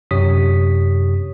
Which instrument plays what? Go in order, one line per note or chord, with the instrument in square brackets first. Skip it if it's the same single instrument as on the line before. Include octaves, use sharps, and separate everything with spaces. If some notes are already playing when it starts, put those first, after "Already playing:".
[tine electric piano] F#2 C3 G4 C#5 D#6 B6